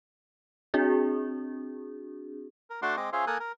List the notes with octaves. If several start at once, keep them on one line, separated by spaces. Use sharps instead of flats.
C4 D4 F#4 G#4
A#4
A3 D4 F#4 F#5 C6 D6
G#3 C4 D#5 D6
C#4 F4 G#4 C5 E5 F5
A#3 A4 A#4 G#5 D#6 F#6
A#4